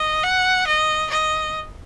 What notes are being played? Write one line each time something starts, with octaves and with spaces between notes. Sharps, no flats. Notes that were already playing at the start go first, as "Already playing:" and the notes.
Already playing: D#5
F#5
D#5
D#5